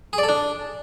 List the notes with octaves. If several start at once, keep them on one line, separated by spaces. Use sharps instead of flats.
G#4
D5
A4
D4